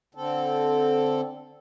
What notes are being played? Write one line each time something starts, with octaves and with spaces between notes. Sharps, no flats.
D3 C4 A4